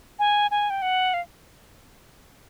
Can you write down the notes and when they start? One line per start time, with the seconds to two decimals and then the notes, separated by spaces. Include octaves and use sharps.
0.19 G#5
0.51 G#5
0.70 G5
0.82 F#5
1.14 F5